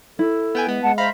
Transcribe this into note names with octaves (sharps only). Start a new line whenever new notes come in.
E4 A4
B3 G5 G#5
G#3 B3
G#3 F#5 A5
C5 E5 F5 A#5 B5